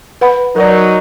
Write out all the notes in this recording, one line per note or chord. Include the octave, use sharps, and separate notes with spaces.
B4 F#5 B5
F#3 D#4 A#4 D5